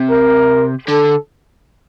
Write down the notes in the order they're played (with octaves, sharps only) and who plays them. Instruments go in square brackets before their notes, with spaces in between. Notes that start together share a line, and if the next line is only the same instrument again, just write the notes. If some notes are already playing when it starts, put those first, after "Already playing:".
Already playing: [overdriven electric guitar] C3
[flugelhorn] A#4
[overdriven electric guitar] D3 [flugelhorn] A4